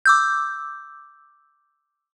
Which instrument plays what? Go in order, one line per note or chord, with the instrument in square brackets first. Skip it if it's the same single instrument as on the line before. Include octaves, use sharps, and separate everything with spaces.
[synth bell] D6 E6 G6